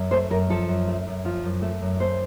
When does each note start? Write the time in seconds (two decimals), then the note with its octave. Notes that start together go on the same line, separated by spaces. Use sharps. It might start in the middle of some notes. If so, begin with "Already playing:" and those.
Already playing: F#2
0.11 A3 C5
0.30 F#2 A#4
0.50 F3 A4
0.68 F#2
0.88 A3
1.07 F#2
1.24 F3 F4
1.43 F#2
1.62 A3
1.81 F#2
2.00 A3 C5